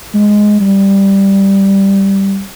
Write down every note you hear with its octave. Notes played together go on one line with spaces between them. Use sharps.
G#3
G3